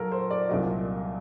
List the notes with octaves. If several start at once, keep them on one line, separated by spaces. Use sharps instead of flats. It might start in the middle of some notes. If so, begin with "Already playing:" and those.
Already playing: A#2 F#3 A4 A#4
C5
D5
C2 A#2 F#3 D#5